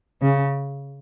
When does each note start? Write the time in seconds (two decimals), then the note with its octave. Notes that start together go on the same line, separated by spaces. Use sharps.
0.22 C#3